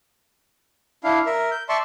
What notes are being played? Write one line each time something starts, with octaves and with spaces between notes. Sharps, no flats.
D4 E4 F5
A#4 E5
G6
D5 E5 A5 C6 C#6